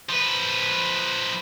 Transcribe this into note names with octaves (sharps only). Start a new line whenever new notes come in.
F3 B4